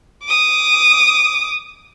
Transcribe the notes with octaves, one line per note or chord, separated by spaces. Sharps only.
D6 D#6